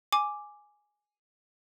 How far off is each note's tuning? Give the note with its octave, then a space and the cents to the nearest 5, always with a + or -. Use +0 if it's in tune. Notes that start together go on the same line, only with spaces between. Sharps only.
G#5 +0 D6 +0